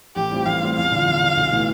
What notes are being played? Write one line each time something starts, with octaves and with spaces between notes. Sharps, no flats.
A1 G4
A2 G3 C4 F4
A1 F5
A2 G3 C4 F4
E2 F5
D3 F3
E2
D3 F3
B1
A2 E3 A3 E4